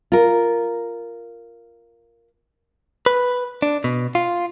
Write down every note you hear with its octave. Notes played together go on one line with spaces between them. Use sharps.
F4 A#4
B4
D4
B2
F4